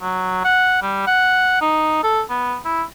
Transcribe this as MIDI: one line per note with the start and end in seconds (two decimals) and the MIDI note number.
0.02 0.41 54
0.45 0.78 78
0.82 1.03 55
1.07 1.56 78
1.61 2.02 63
2.04 2.21 69
2.29 2.56 59
2.65 2.83 64